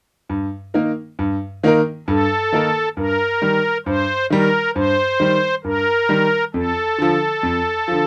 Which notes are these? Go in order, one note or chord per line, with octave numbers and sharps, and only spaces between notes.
G2
D#3 A#3 D#4 A#4
G2
D#3 A#3 D#4 A#4
G2 A4
D#3 A#3 D#4 A#4
G2 A#4
D#3 G3
G2 C5
D#3 G3 A#4
G2 C5
D#3 G3
G2 A#4
D#3 G3
F2 A4
D3 F3
F2
D3 F3